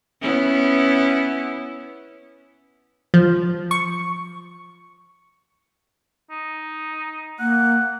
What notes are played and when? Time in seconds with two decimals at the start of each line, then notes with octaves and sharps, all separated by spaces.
0.22 B3 C#4 E4
3.14 F3
3.71 C#6
6.31 D#4
7.39 A#3 F#5